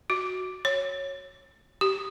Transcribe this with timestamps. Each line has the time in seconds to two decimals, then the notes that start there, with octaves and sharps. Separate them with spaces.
0.10 F#4
0.65 C#5
1.81 G4